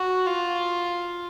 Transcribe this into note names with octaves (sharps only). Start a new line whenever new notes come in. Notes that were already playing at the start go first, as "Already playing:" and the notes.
Already playing: F#4
F4